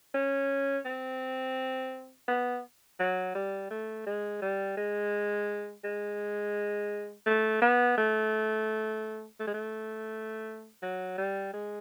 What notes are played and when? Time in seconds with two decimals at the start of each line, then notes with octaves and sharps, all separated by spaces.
0.14 C#4
0.85 C4
2.28 B3
3.00 F#3
3.35 G3
3.71 A3
4.06 G#3
4.42 G3
4.77 G#3
5.84 G#3
7.26 A3
7.62 B3
7.98 A3
9.40 A3
9.47 G#3
9.54 A3
10.82 F#3
11.18 G3
11.53 G#3